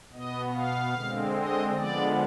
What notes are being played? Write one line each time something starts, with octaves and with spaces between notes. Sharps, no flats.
B2 B3 D#5
F5
D3 G#3 C4
D#5
D3 F3 G#3 B3 D5